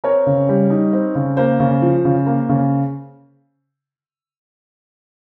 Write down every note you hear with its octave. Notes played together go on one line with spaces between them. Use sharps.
C4 A#4 C#5
C#3
G3
D#4
C4
C#3
A#3 C5
C#3
F3
C#3
A#3
C#3